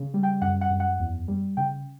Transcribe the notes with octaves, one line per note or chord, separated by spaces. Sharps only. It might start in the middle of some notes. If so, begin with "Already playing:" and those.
Already playing: C#3
G3
G5
F#2 F#5
F#5
F#2
F#5
E2
G3
C#3 G5